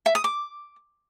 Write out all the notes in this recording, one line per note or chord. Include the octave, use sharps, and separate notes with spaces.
E5
D#6
D6